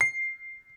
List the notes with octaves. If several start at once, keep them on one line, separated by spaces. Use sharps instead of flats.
C7